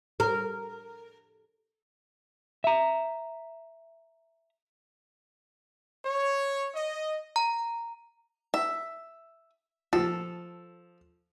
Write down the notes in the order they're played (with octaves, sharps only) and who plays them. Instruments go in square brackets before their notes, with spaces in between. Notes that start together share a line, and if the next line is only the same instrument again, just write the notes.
[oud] A#4
[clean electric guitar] E5 A#5
[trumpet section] C#5
D#5
[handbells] A#5
[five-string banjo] E5
[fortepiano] F3 [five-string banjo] A4